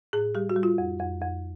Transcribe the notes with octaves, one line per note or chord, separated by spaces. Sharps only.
A2 G#4
G3 G4
F#4
G3
F4
F2
F2
F2